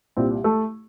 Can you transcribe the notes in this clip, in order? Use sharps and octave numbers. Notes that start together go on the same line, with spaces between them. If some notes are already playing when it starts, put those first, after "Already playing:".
C2 A#2 G3 C4
A3 A4